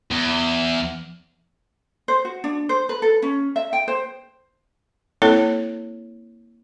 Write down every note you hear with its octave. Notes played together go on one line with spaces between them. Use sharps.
E2
C5
F#4
D4
C5
B4
A4
C#4
E5
G5
C5
A#3 C4 E4 A4 C#5